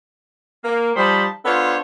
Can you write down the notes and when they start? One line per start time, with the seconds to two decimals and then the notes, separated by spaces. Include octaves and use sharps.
0.65 A#3
0.96 F3 G3 D#4 C5 A5 B5
1.45 B3 D4 F4 A4 C5 C#5